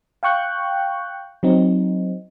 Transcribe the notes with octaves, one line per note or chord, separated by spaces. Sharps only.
F5 G5 C#6 F#6 G6
F#3 C4 D#4